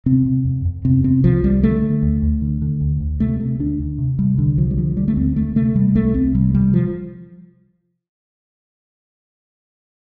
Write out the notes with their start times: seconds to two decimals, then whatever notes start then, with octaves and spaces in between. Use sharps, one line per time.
0.06 C3 C4
0.26 C3
0.45 F2
0.65 F2
0.85 C3 C4
1.04 C3 C4
1.24 C2 F3
1.43 C2 G3
1.63 D3 A3
1.83 D3
2.02 D2
2.22 D2
2.42 D3
2.62 D3
2.81 D2
3.00 D2
3.20 C3 A3
3.40 C3 A3
3.59 D2 D4
3.79 D2
3.98 C3
4.19 C3 G3
4.38 C2 D3
4.57 C2 F3
4.71 G3
4.77 D3 F3
4.97 D3 G3
5.08 A3
5.17 D2 C4
5.36 D2 A3
5.56 C3 A3
5.75 C3 G3
5.95 C2 A3
6.14 C2 C4
6.34 C3 G3
6.54 C3 G3
6.74 F3